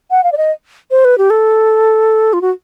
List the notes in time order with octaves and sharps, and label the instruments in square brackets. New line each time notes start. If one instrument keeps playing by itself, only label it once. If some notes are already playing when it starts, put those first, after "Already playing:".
[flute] F#5
F5
D5
D#5
C5
B4
G4
A4
F4
F#4